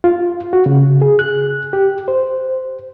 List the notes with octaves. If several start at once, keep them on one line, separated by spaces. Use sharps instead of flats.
F4
F#4
C#3
G#4
F#6
G4
C5